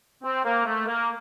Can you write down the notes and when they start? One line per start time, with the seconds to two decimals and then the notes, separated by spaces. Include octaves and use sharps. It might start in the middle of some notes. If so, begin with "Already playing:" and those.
0.23 C4
0.44 A#3
0.65 A3
0.87 A#3